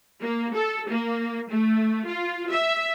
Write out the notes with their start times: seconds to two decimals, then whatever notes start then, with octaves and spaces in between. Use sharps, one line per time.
0.21 A#3
0.55 A4
0.89 A#3
1.50 A3
2.07 F4
2.51 E5